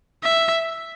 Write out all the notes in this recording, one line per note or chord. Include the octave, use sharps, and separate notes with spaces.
E5